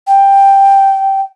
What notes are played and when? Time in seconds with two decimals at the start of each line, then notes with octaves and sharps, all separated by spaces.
0.07 G5